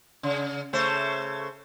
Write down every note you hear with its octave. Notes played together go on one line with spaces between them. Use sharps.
C#3
C#3 A3 C5